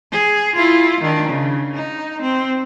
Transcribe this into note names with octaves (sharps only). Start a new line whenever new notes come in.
G#4
E4 F4
D#3 D4
C#3
D#4
C4